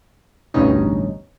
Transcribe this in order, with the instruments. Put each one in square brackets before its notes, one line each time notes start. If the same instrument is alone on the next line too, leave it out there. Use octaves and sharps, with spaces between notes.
[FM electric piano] A1 D2 G2 B2 C#4 D#4